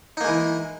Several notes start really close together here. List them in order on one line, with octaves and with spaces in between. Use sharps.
D#4 A#3 G#3 E3